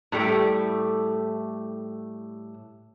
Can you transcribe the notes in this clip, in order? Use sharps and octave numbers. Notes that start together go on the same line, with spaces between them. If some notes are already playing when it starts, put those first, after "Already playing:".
A2 G3 A3 G4